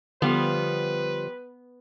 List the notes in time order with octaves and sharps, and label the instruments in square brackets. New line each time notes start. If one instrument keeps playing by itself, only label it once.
[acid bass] D3 [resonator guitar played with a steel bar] F3 G3 [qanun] B3 F5 [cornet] B4